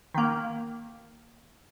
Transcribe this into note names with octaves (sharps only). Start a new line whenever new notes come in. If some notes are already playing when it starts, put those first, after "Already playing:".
D#3 A#3